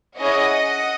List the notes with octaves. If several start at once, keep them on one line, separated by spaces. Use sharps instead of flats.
C#4 E4 G#4 D#5 F#5